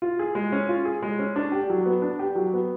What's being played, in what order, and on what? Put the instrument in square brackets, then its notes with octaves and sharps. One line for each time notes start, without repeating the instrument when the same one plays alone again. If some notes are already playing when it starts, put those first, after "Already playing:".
[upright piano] F4
G#4
G#3
C#4
F4
G#4
G#3
C#4
D4
G4
F#3
B3
D4
G4
F#3
B3